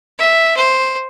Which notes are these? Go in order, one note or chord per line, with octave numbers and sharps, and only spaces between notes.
E5
C5